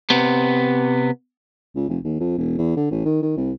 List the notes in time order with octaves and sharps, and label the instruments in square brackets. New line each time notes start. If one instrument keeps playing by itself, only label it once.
[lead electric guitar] C3 B3
[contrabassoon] C#2
F1
D#2
F2
E1
E2
D3
A1
D#3
D#3
C2